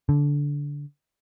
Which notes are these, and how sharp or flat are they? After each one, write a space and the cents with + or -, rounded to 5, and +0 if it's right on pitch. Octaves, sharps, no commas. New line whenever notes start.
D3 -20